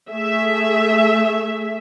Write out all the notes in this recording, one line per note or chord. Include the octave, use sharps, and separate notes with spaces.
A3 G#4 E5